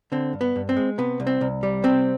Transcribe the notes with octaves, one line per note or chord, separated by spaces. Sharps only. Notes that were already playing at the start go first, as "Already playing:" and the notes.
D3 C4
G2
B3
G2
C4
G#3
C3 B3
C2
C4
C2
G3
C3 C4